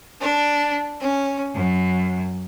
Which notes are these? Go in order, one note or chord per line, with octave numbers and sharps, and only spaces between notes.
D4
C#4
F#2